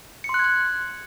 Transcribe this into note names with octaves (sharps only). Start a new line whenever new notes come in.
C#7
C6
F#6
G#6
F#6